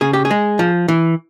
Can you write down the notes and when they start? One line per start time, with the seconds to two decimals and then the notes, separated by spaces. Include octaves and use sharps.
0.01 C#3 G#4
0.13 G4
0.25 G#4
0.31 G#3
0.59 F3
0.88 E3